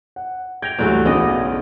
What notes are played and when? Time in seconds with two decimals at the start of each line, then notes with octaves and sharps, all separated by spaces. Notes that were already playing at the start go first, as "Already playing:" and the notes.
0.16 F#5
0.62 G5 G#6 A#6 F7
0.79 D2 G2 E3 F#3 A3
1.06 B1 C#3 B3 D5 D#5